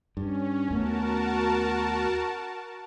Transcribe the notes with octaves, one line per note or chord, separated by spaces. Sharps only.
G2 C#4
D#2 A3 B3 F#4 A#4 A5